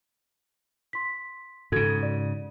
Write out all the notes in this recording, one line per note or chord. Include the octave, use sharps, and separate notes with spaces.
C6 B6
G#2 C#3 F#4 A4 G#6
D5